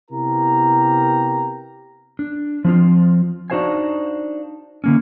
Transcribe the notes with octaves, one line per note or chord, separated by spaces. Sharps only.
C3 B3 E4 G4 A#4 A#5
D4
F3 C4 F4
D4 D#4 F#4 C5 F5 G#5
D3 A#3 C#4